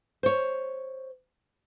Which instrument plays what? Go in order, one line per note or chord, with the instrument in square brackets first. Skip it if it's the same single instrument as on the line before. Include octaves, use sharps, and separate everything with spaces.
[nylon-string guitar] C5 C#5